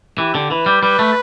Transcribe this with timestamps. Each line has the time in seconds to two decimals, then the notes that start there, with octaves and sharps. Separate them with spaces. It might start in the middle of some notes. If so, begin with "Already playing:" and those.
0.18 E3 G4
0.35 D3
0.51 E3 B4
0.66 G3
0.82 G3 B4
0.99 A3